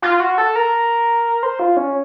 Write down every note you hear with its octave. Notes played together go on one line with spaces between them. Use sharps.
F4
F#4
A4
A#4
C5
F4
C#4